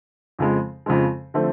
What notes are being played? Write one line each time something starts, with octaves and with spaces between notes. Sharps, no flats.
F2 C#3 F3 G#3
F2 C#3 F3 G#3
D3 F3 A3 C4